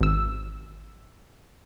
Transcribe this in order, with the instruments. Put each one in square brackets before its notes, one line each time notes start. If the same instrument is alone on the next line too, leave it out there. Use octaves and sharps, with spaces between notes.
[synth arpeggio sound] G#1 E6